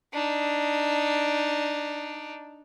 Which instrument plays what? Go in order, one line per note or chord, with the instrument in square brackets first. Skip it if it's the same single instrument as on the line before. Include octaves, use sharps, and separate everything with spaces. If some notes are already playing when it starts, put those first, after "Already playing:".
[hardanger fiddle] D4 D#4